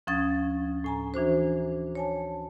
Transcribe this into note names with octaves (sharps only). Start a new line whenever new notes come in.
D2 F3 C#4 D#6 G#6 A6
A2 G#5 A#5
E3 D4 F#4 C5
C#5 G#5 A5